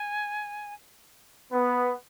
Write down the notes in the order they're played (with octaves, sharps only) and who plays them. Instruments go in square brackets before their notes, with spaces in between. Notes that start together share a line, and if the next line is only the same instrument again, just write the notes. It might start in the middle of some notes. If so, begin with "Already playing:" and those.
Already playing: [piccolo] G#5
[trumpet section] B3